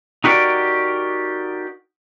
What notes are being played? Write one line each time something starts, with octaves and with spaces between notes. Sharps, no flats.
D#4 F#4 G4 A#4 D5